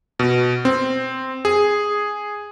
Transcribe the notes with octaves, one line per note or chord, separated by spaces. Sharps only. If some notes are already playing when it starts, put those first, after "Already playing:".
B2
C4
G#4